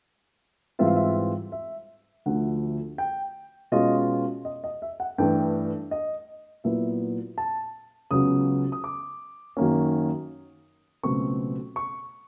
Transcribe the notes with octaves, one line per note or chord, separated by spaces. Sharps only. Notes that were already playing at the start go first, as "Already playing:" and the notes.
G#2 E3 G3 C4 F4 E5
F5
E5
E5
D2 D3 F3 A3 F#5
G5
B2 G#3 C#4 F4 D#5
D#5
D#5
E5
F#5
G2 E3 A3 G5
D#5
A#2 F#3 B3 E4 E5
A5
C#2 C#3 F#3 B3 D#6
D#6
D6
F#2 D#3 F#3 A#3 C#4
C#2 B2 F#3 A3 C4 C#6
C#6